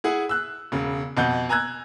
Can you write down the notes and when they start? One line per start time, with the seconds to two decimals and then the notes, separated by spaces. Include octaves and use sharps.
0.04 E4 G#4 F#5
0.29 E6 F#6
0.72 E1 C#3
1.17 F2 B2 D#5 F#5 G6
1.49 G#5 A#5 E6 F#6 G#6